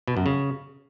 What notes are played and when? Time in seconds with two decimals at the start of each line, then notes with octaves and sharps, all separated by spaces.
0.08 B2
0.17 F#2
0.26 C#3